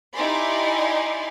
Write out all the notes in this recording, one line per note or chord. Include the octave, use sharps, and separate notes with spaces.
D#4 E4 G4 D5 G#5 C6